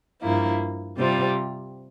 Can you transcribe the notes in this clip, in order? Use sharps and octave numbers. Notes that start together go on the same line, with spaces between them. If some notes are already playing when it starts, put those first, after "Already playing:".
G2 F3 A#3 E4
C3 G3 C4 F4